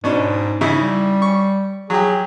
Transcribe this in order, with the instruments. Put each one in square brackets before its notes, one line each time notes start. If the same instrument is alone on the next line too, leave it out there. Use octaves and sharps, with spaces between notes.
[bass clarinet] G#2 [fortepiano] B2 C#4 D4
[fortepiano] C#3 D#4 E4
[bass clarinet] G3
[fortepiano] C#6
[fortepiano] F#3 G4 [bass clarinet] G#4